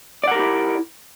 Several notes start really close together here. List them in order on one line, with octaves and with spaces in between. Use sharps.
D5 F#5 A#4 G4 E4